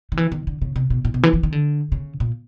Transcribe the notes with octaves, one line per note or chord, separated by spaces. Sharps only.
D#3
E3
D#3
D3
C#3
C3
B2
A#2
B2
E3
E3
D#3
D3
C#3
A#2